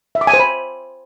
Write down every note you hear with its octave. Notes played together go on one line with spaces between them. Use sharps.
E5
D6
G#5
C5
B5